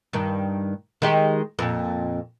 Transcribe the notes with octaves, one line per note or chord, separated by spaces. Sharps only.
G2 D#3
D#3 G#3 G4
F2 A#2